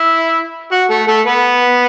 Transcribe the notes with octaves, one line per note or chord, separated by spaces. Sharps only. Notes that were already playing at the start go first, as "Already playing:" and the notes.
Already playing: E4 E5
F#4 F#5
A3 A4
A3 A4
B3 B4